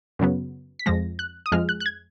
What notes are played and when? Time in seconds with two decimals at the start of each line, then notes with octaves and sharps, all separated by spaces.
0.19 F#2 C#3 F#3 B3
0.79 B6
0.86 F2 F3 G#3 A#6
1.19 F#6
1.46 D#6
1.52 F2 F3 G#3 F6
1.69 F#6
1.80 F#6
1.86 G#6